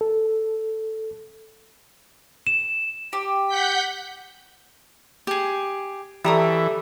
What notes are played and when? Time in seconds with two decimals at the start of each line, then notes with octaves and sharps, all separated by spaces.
0.01 A4
2.47 E7
3.13 G4
3.47 F#5 G6 B6
5.27 G4 G#4
6.24 E3 G3 A3 E5 A#5 D#6